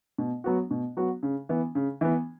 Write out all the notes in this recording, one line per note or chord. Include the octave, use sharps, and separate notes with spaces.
B2
F#3 B3 F#4
B2
F#3 B3 F#4
C#3
E3 B3
C#3
E3 B3